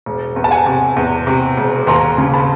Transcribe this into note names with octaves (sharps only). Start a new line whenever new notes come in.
E1
E2
A5
F#5 G#5
C3
E2
C3
E1
D#2 A#5 C6
C#3
A5 B5